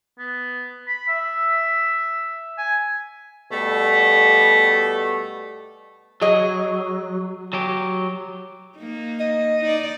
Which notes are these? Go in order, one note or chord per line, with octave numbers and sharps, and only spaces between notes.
B3
B5
E5
G#5
B2 G3 A3
F#3 G#4 D#5
F#3 G4
A#3 D#4
D#5
D#4 D5